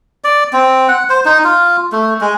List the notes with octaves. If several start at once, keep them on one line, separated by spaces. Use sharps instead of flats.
D5
C4
F#5
C5
D#4
F4
A3
G#3